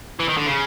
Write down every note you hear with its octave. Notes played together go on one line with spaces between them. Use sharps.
E3
D#3
D3
C#3